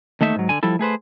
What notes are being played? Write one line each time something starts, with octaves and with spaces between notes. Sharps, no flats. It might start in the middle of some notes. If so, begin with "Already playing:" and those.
D#2 A3 D#4 E5
G#2 F#3
D3 G#5
F3 G3 E4 A4
A3 G#4 B4 C5